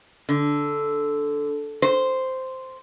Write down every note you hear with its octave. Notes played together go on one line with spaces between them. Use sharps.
D3
C5